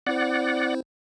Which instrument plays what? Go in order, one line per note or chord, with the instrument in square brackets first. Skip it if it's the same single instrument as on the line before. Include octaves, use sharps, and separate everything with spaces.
[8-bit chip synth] C4 E4 C5 [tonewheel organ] D5 F#5